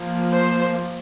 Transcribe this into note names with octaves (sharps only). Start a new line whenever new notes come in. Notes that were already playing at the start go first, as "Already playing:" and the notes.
Already playing: F3 A#3
C5